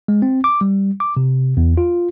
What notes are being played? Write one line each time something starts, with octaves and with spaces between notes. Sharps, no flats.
G#3
C4
D6
G3
D6
C3
E2
F4